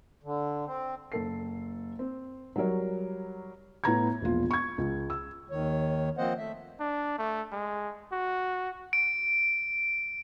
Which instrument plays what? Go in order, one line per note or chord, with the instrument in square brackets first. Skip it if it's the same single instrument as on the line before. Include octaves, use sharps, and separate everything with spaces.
[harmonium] D3
C4
[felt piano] F#1 A4 C7
C4
F#3 G3 F#4 A#4 C#5
A2 B3 A#5 G#6
E1 A#1 F4
C#6 G#6
C#2
E6
[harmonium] D#2 D#3 C#5
F3 A#3 C4 C5 D#5 F#5
A3 E5
[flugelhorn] D4
A3
G#3
F#4
[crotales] D7